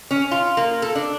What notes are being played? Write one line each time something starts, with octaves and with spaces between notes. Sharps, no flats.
C#4
F4
A#3
A4
D4